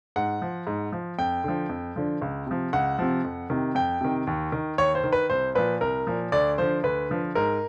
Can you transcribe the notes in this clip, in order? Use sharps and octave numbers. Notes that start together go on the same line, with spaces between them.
G#2 F#5
F3
G#2
F3
F2 G5
D3 F3
F2
D3 F3
C#2
C3 F3
C#2 F#5
C3 F3
F2
C3 D#3
F2 G5
C3 D#3
D#2
D#3
D#2 C#5
C5
D#3
B4
C2 C5
A#2 F3 B4
C2 A#4
A#2 F3
D2 D5
D3 F3 C5
D2 B4
D3 F3
G#2 A#4